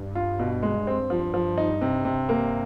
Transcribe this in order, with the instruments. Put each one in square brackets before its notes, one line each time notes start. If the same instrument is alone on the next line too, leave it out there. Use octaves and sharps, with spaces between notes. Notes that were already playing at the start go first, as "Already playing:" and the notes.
Already playing: [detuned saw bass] G2
[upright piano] F4
B2
G#3
C4
F3
F3
D#4
C3
C3
A#3